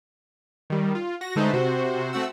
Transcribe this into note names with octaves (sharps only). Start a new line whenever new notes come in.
D#3 G3
F4
F#4 A#6
D3 G#3 A3 D#4 B4 C5
C3 F#4 C5
A3 C4 F#4 F#5 E6